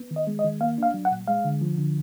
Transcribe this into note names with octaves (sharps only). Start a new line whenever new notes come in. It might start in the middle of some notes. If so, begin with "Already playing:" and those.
Already playing: B3
D#3
D#5
G#3
D#5
D#3
A#3 F5
D4 F5
F#3
F#5
A#2
G#3 F5
D3
F3
D3